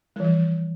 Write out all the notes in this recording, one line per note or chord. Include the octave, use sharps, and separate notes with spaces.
E3 F3 G3